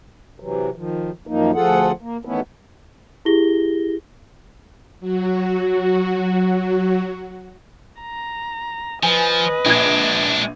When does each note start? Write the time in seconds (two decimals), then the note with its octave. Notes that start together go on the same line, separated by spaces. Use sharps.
0.40 C3 E3 F#3
0.76 D#3 F3
1.27 F#2 D#3 F3 A#3 D#4
1.54 D2 F3 F4 G#4 A4 F#5
2.01 A#3
2.25 D#3 E3 A3 B3 C#4 E4
3.25 E4 G4 G#4 A#6 G7
5.00 F#3 F#4
8.02 A#5
9.03 F3 B4 D#5 G#5
9.65 A#1 G#3 D4 G#6